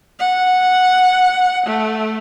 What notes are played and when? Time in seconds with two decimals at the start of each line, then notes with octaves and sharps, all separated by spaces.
0.19 F#5
1.67 A3